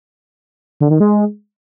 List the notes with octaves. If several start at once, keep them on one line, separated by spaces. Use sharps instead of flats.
D3
D#3
G#3